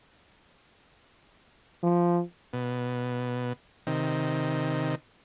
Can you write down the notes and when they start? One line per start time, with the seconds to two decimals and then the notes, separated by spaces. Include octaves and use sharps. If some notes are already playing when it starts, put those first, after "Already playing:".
1.83 F3
2.53 B2
3.87 C3 D#3